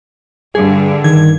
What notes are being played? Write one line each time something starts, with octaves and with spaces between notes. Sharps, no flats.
G2 D3 G#4
D#3 G#6